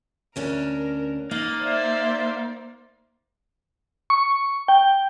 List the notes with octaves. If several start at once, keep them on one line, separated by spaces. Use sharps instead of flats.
D2 C#4 D4 A#4
A#3 D#4 A6
C5 D5 E5
C#6
G5